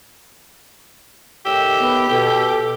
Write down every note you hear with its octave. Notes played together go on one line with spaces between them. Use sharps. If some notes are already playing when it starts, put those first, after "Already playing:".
A2 D#3 G4 E6
B3
B2 A4